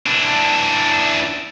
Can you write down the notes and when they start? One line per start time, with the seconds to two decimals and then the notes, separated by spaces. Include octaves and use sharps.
0.06 E3 D4